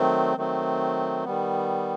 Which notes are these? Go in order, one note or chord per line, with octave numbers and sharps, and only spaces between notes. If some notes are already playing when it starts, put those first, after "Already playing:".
Already playing: D#3 F#3 A3 C4
D#3 F#3 A3 C4
D#3 G3 B3